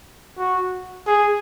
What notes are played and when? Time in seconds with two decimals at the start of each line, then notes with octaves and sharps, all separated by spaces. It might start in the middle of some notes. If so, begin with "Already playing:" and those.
0.38 F#4
1.07 G#4